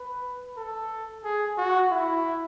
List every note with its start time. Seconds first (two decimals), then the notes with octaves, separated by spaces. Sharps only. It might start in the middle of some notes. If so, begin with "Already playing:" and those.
Already playing: B4
0.57 A4
1.24 G#4
1.57 F#4
1.91 E4